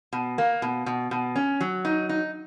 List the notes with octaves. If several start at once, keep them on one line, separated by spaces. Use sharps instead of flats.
B2
A#3
B2
B2
B2
C#4
F#3
D#4
D#4